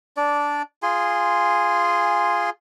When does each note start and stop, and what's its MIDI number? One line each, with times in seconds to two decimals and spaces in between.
0.17 0.62 62
0.17 0.62 74
0.83 2.50 65
0.83 2.50 68
0.83 2.50 80
0.83 2.50 84